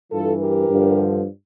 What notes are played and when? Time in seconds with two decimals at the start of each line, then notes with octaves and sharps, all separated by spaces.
0.12 G2 E3 F4 A4
0.41 G4 A#4
0.69 G2 D3 F3